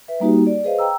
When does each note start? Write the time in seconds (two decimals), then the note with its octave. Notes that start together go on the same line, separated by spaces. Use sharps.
0.08 B4 E5
0.20 G3 A#3 D#4 F#4 G4
0.47 D5
0.64 G#4 B4 C5 D#5 F5
0.79 G5 A#5 E6